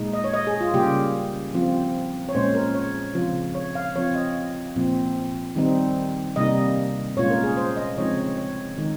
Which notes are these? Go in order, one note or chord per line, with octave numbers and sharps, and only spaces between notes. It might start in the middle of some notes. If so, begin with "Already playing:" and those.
Already playing: A#2 G#3 D#4
D#5
C#5
D#5
G#4
F4
C#3 G3 A#3 F4 G4
F3 C4 F4
C#5
A#2 G#3 C#4 C5
A#4
C#5
C#3 F3 C4 F4
C#5
F5
F3 C4 F4 C#5
D#5
A#2 F3 C4
D#3 G3 C4 D#4
C3 G3 A#3 D#4 D#5
A#2 G#3 C#4 F4 C#5
A#4
G#4
C5
D#5
C#3 F3 G#3 C4 D#4 C#5
C#5
C#5
D#3 G#3 D#4